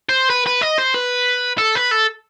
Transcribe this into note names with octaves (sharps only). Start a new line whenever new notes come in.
C5
B4
B4
D#5
C5
B4
A4
B4
A4